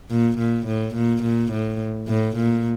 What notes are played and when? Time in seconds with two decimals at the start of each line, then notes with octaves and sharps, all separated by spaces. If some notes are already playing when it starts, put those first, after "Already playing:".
0.10 A#2
0.38 A#2
0.66 A2
0.95 A#2
1.23 A#2
1.51 A2
2.08 A2
2.36 A#2